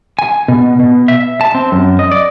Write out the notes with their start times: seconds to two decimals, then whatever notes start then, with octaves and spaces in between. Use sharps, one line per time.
0.19 G#5
0.48 B2
0.79 B2
1.08 E5
1.41 A5
1.55 C4
1.72 F#2
1.99 D#5
2.12 D5